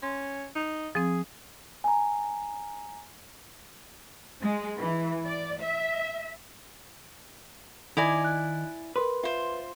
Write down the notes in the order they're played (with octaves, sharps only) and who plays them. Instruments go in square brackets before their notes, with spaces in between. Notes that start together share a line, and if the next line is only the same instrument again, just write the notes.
[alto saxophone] C#4 [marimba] C6
[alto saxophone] D#4
[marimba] F3 C4 [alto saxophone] G#4
[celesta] G#5 A#5
[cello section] G#3
E3
D5
E5
[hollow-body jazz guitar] D#3 [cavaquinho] E4 D5 G#5 [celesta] D6 A#6 F7
[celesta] F#6
[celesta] A#4 C6 [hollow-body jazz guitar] B4
[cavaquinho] F4 C5 [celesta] E5